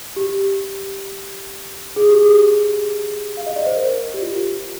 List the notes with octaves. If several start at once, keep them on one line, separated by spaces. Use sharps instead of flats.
G4
G#4
G4
G#4
F5
D#5
D5
C5
A#4
G4
F4